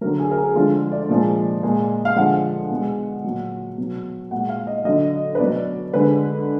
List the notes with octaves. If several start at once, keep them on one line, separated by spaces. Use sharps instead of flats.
D3 F#3 A#4
G#4
A#4
G#4
D3 F3 G#3 F4
D5
A#2 F3 G#3
A#2 G#3
F5
D3 F3 G#3 F#5
B2 G#3
A#2 F#3
B2 F#3
A#2 G#3 F#5
F5
D#5
D3 F#3 D#5
B4
B2 F#3 D5
D3 G#3 B4